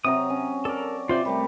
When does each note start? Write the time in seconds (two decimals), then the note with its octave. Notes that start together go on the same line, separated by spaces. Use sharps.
0.05 C3 F#3 A#5 D#6
0.30 C#4
0.65 A4 A#4 D5
1.09 C3 F4 C5 D5
1.25 G3 A3 A#4 A5